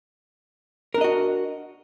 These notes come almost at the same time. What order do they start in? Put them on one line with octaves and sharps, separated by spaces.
A#4 D4 D#5 F#4